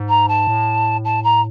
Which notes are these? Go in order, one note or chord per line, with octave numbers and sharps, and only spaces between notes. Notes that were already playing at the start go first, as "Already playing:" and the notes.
Already playing: G#2
A#5
A5
A2
A5
A#5